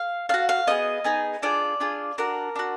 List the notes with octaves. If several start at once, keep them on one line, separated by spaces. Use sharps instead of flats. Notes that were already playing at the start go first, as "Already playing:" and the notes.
Already playing: F5
D4 F#4 F5
F5
B3 D#4 G#4 D#5
B3 D#4 G#4
D4 F4 G#4 D5
D4 F4 G#4
D4 F#4 A#4
D4 F#4